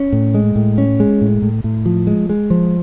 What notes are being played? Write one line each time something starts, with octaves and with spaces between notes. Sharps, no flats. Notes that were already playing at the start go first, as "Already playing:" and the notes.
Already playing: C#4
A2
G#3
A2
C#4
G#3
A2
A2
A2
F3
G#3
G#3
F3